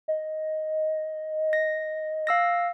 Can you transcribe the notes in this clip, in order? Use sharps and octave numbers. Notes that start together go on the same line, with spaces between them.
D#5
A#6
F5 E6 A#6